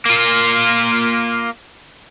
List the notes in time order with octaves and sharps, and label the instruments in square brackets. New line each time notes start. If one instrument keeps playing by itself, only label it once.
[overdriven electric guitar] A#3 F4